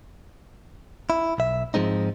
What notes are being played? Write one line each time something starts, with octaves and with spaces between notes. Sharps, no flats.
E4
B1 E5
G#2 F3 G#3 C4 D#4